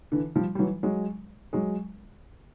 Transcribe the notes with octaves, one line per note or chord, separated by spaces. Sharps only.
D3 E3
F3 G3
G3
E3 F#3
F#3 G#3
F#3 G#3